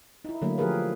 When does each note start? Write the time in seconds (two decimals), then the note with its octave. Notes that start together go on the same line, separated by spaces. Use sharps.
0.25 D#4 E4
0.42 D3 F#3 A3 A#3
0.58 F3 G4 G#4 A#4 B4